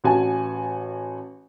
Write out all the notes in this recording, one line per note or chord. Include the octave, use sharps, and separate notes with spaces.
A1 F#4 G#5 A5